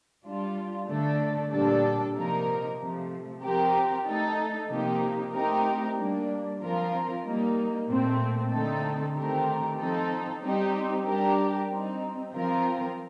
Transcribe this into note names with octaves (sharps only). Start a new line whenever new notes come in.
G3 D4 F4
D3 A3 D4 A4
A#2 G3 A#3 D4 A4
C3 F3 A#3 D#4 A#4
C3 F3 A3
F3 C4 G4 A#4
A3 D#4 A4
C3 F3 A#3 D#4 G4
A3 C4 D#4 G4 A#4
G3 A#3 D4
F3 C4 F4 A#4
G3 A#3 D#4
A#2 A3 C4
D3 A3 C4 D#4 A4
D#3 A3 C4 G4 A#4
F3 C4 D#4 A4
G3 C4 D#4 G4
G3 D4 G4 A#4
G3 C4 D#4
F3 C4 F4 A#4